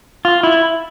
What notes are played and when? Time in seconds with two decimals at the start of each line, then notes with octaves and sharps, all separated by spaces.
0.25 F4
0.43 E4